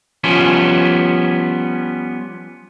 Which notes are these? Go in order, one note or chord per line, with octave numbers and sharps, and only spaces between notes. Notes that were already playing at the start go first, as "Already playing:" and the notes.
F3 G3 B3 C#4